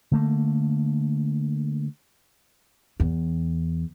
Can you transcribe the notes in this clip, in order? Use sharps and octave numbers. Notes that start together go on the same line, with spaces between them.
D3 A3 A#3
E2